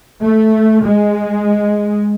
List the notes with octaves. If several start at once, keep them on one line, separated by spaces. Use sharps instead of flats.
A3
G#3